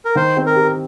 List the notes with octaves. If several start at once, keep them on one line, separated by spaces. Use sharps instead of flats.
A#4
D#3 C5
C4
A#4
G4